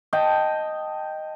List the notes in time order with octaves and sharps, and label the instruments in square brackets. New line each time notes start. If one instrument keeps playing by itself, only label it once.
[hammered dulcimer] D#5 G5 A5